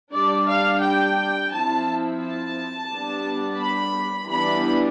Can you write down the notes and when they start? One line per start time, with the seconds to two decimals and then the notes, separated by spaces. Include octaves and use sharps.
0.13 G3 D4 D5
0.48 F5
0.83 G5
1.52 F3 C4 E4 A5
2.22 A5
2.92 G3 B3 D4
3.61 B5
4.30 E3 G3 B3 D4 B5